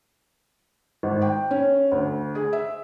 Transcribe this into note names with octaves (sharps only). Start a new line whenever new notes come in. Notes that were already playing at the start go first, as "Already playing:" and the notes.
G#1
G5
C#4
D2
G#4
E5